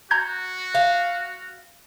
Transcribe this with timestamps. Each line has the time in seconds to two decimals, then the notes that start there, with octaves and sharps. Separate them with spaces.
0.11 F#4 A#5 G6 G#6
0.75 F5